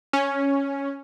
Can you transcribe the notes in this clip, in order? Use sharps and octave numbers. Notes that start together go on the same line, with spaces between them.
C#4